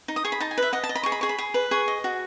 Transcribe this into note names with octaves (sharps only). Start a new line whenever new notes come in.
D#4
D#6
G#4 C#6
B5
D#4 A5
G#5
B4 E5
D#5 F#5
A5
D#5
B5
G#4 C#6
B5
G#4 C#6
B5
G#4
B4
G#4 C#6
D#5
F#4